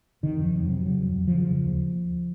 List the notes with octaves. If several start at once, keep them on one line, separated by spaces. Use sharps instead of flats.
C3 D#3
F2
F3
F2
F#3
C3
C#3 F#3
F2
F2
F3
C#3
C#3
D#2